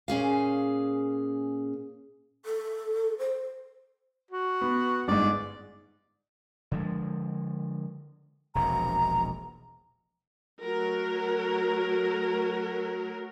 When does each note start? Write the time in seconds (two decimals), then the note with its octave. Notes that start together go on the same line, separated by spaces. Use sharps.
0.08 A#2 C#4 G#4 F5
2.46 A4
3.19 C5
4.31 F#4
4.61 B3
5.08 G1 G#2 D5
6.72 D3 F3 G#3
8.55 E1 A#1 C3 A#5
10.63 F#3 A3 F#4 A#4